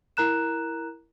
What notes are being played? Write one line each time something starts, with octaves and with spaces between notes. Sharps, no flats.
E4 A#4 A#5 F#6 E7